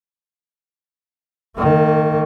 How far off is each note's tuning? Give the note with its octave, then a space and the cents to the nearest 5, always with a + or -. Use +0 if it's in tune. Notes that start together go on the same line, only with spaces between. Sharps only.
D#3 -10 A3 +45